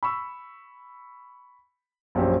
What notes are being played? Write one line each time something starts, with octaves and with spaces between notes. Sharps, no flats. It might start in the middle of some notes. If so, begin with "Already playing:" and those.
B5 C#6 E6
A#1 F#2 G4 C5